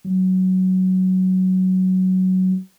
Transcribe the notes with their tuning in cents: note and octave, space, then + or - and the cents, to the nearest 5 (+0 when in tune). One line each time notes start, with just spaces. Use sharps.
F#3 +10